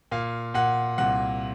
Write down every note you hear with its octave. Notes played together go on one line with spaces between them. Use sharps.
A#2 F5
A#2 F#5
C2 F#5